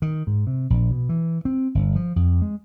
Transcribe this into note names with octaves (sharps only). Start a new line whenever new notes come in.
D#3
G#2
C3
A#1
B2
E3
C4
G1
F3
F2
G#3